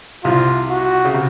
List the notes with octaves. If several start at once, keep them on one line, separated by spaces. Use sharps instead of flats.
C2 C3 F4
F#4
C#3
C3